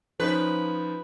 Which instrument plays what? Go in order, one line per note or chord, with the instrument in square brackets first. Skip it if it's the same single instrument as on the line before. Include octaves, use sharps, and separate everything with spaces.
[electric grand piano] F3 C#4 D#4 [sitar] B4